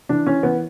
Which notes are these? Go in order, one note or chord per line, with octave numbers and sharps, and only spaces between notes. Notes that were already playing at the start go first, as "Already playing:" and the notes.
E3 D4
E3 C#4
E3 B3